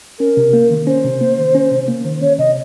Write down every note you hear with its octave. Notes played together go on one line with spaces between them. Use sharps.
C#4 A#4
C3
A#3
D#3
C#4 C5
C3
A#3
D#3
C#4
C3
A#3
D#3
C#4 C#5
C3 D#5